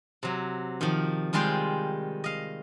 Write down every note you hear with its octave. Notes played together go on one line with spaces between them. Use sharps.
C3 F#3
D#3 F3
D#3 G3 G#3 F4 C5 G5
D#5 F5